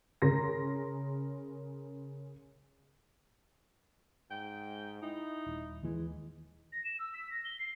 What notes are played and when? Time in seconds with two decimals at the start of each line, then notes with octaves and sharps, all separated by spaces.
0.22 C#3 A#4 C6 A#6
4.31 G#2 G5
5.03 D#4 E4
5.46 D#1
5.83 D#2 E3 G#3
6.72 A#6
6.84 E7
6.99 E6
7.13 B6
7.30 A#6
7.44 G7
7.59 C7